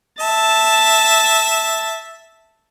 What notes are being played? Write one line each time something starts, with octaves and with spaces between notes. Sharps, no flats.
E5 A5